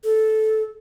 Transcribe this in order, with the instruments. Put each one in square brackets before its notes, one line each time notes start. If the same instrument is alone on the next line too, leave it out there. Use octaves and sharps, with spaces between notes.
[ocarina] A4